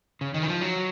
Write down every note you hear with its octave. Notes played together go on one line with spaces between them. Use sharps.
C#3
D#3
E3
F3
F#3